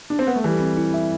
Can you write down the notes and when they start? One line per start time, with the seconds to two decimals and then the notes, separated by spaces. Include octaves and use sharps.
0.10 D4
0.19 C4
0.27 B3
0.36 A3
0.44 E3 G3 A4
0.61 C4
0.77 E4
0.94 E5